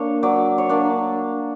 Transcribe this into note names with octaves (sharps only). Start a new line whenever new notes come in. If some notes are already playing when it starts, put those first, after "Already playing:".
Already playing: A#3 D4 C#5
F#3 D5
C#5
A#3 D4 D5